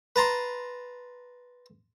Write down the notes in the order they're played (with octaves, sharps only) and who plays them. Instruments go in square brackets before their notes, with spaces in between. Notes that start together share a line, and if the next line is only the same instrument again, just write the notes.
[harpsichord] B4 A5 A#5 C6